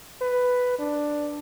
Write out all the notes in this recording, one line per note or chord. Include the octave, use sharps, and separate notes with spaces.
B4
D4